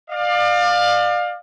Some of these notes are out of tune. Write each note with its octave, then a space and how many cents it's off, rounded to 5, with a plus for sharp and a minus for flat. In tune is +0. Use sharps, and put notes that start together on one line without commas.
D5 +35 F5 +20